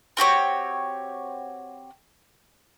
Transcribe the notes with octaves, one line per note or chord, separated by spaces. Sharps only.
C4 F#4 G4 C#5